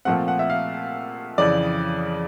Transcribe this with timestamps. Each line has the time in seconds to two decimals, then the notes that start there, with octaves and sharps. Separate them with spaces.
0.05 A#2 F3 A3 C4 F#5
0.28 F#5
0.39 E5
0.50 F5
1.38 F2 C#3 E3 D5